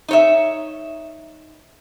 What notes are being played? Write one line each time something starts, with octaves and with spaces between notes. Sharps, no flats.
D#4 C#5 E5